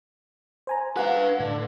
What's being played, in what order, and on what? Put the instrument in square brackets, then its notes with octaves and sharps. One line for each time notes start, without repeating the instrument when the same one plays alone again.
[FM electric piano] C5 G#5 A#5
[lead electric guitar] B4 F5 [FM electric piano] F#5
[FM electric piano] A2 [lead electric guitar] D3